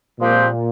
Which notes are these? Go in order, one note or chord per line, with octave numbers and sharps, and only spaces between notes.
A#2 F3 G#3 C4 G4